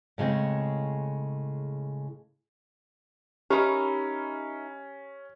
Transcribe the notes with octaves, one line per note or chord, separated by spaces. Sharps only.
A2 C#3 G#3 C4
C#4 D#4 E4 G4 A#4